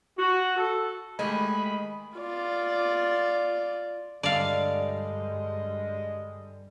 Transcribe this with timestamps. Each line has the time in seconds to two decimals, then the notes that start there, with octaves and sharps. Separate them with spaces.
0.18 F#4
0.57 A4
1.19 D#3 G#3 A3 G4 D#5 G#5 B5
2.19 F4 D5
4.23 G2 D3 G3 G#3 D5 D#5 F5